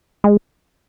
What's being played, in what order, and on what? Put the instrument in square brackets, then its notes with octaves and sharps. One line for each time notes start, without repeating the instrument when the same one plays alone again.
[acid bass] G#3